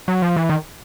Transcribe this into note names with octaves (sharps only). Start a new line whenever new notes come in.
F#3
F3
E3
D#3